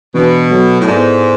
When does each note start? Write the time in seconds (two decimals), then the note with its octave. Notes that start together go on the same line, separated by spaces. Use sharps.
0.14 B2 E3 B3 D4
0.51 F#3 B3 F#4 A4 C#5
0.80 A2
0.87 G#2 B3 E4 A4 D5